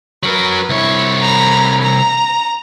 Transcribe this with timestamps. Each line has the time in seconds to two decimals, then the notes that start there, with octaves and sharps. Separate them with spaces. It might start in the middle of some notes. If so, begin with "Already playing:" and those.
0.23 F#3 A#4 B4
0.69 C2 E4 C#5
1.21 A#5 B5
1.82 A#5